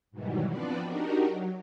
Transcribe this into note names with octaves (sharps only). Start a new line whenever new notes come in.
G#2 B2 D#3 E3 F#3 G3
F3 B3 C4 D4 B4 D5
D4 D#4 F#4 G4 A#4
F#3